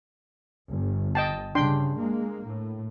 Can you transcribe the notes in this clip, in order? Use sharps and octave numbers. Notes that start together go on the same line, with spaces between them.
G1
D#5 G5 A5
G2 C#3 D4 G5 C6
G#3 A#3
A2